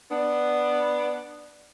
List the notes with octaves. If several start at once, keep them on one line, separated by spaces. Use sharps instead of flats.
B3 D4